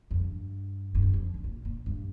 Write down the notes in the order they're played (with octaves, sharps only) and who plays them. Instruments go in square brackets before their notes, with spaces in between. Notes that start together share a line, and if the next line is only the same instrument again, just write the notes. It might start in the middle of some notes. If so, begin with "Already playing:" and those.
[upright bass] F2
G2
G2
F2
F2
G#2
A#2
A#2
G2